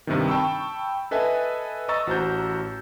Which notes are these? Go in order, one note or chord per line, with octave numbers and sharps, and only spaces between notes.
G2 C3 D#3
G5 A5 B5 C#6 E6
A4 B4 D#5 E5 G#5 A5
D#5 A#5 C#6 E6 A6
A1 F#4 C5 A#5 G6